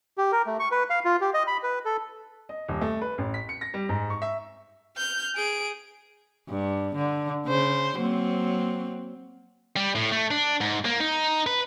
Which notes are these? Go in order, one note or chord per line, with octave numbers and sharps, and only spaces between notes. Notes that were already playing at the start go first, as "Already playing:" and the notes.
G4
A#4
A3
C#6
B4
F5
F4
G4
D#5
B5
B4
A4
D#5
D#1
A3
B4
A1
B6
C#7
A#6
G3
G#2
C#6
E5
F6 G6
G#4 D7
G2
D3
C#3 C5
F#3 A#3 C4
G3
A2
A3
D4
G#2
A#3
D#4
B4